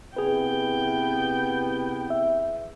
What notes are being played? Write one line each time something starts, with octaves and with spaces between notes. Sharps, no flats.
C3 B3 E4 G#4 B4 G5
E5